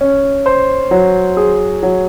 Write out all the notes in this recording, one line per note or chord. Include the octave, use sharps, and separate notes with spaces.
C#4
C5
F#3
G#4
F#3